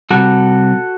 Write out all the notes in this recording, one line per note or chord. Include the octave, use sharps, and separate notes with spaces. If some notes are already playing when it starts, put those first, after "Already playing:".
C3 G3 F#4 A4